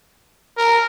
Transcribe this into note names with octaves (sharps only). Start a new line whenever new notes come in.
A#4